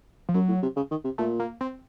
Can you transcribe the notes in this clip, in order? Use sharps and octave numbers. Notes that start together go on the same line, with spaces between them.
F3
F#2 F#3
A2
C3
C#3
D#3
C3
A#2 A3
A#3
C4